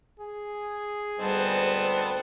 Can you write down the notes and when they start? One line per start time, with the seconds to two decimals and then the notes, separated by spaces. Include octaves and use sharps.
0.20 G#4
1.19 D2 G#2 G3 B3 C4 A5